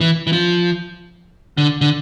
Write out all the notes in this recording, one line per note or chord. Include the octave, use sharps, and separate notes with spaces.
E3
E3
F3
D3
D3